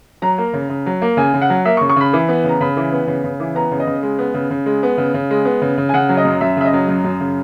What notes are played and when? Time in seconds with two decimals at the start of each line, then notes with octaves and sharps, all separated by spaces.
0.22 F#3 A#5
0.38 A#3
0.53 C#3
0.69 C#3
0.86 F#3
1.02 A#3
1.17 C#3 G#5
1.34 C#3
1.41 F#5
1.50 F#3
1.65 A#3 E5
1.77 C#6
1.81 C#3
1.89 C#6
1.96 C#3 B5
2.13 E3
2.29 B3
2.44 C#3 A#5
2.61 C#3 B5
2.77 E3
2.92 B3
3.07 C#3
3.24 C#3
3.40 E3
3.55 B3 A#5
3.71 C#3
3.80 D#5
3.87 C#3
4.03 G#3
4.19 B3
4.34 C#3
4.50 C#3
4.66 G#3
4.83 B3
4.98 C#3
5.14 C#3
5.30 G#3
5.45 B3
5.62 C#3
5.77 C#3
5.89 G#5
5.93 C#3 F#5
6.09 F#3
6.17 D#5
6.25 F#2
6.41 F#2 E5
6.57 C#3 E5
6.65 D#5
6.73 F#3
6.88 F#2
7.04 F#2
7.20 C#3